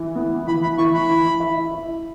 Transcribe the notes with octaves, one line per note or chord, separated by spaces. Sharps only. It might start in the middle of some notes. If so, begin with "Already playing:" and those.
Already playing: E3
B3
E3 B5
B5
E3 C#6
B5
E3
E4
E4